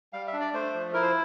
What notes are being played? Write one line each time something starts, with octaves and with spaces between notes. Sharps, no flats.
G3 F5
E5
D4
D5
A3 C5
F3
E4 A#4
C5